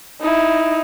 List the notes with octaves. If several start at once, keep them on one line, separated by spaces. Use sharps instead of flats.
D#4 E4